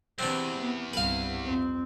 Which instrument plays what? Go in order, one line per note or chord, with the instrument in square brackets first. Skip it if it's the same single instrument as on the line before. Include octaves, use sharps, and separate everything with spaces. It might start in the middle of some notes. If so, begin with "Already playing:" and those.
[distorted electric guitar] E2 [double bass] C3 E3 [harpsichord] C4 D4
[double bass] B3
[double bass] C2 G2 [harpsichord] B4 F5
[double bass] F2 C4